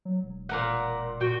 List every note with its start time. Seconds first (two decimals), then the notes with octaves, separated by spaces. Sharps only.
0.05 F#3
0.23 E1
0.49 A#2 A#4 F#5
1.21 A#2 F#4 G5